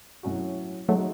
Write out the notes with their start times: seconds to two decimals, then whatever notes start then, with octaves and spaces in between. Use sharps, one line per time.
0.23 A2 F#3 C#4 F#4
0.89 F#3 G#3 A3 D#4 F#4